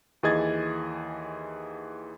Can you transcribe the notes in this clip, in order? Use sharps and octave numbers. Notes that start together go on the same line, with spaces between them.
D#2 E3 G#4 D#5 G#6 A6